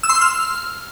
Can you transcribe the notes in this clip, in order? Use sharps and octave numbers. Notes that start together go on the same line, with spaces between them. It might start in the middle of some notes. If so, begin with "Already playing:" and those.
E6
C6
E6
F6